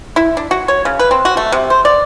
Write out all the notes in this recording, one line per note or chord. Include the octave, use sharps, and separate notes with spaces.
E4
D4
F#4
C#5
C#3
B4
C4
F#4
A3
C3
C5
D5